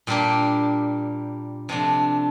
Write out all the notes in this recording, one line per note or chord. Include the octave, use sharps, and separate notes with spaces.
A#2 G3 A#3 D4 G4
C3 F3 A3 D4